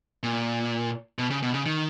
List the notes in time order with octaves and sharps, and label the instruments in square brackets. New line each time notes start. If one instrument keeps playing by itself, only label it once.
[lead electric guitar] A#2
B2
C#3
B2
C#3
D#3